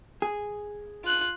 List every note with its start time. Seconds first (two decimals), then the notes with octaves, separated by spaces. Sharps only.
0.22 G#4
1.04 F4 F#6